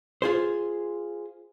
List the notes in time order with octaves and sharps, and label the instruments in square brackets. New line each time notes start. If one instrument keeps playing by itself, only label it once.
[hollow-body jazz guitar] F4 G#4 C5